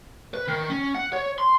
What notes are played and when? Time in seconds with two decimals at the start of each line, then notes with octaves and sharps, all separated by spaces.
0.34 B4
0.48 D#3
0.70 C#4
0.95 F#5
1.13 C#5
1.38 C6